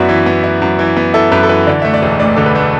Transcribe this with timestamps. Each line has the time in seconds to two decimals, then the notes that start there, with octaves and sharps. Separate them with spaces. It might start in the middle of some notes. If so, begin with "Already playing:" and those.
Already playing: F#2 B3 E4 F#4 D5 E5
0.09 E3
0.26 B3
0.44 E4
0.62 F#2
0.79 E3
0.97 B3
1.14 E4 A4
1.32 F#2 B4
1.43 A4
1.49 E3 B4
1.67 D3 D5
1.82 A3 E5
1.94 D5
2.02 E1
2.20 D2 D5
2.36 D3 A4
2.46 B4
2.55 A3